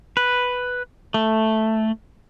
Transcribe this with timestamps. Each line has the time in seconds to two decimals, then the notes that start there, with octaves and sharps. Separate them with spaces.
0.17 B4
1.14 A3